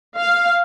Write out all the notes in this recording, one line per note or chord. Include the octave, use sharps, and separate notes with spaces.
F5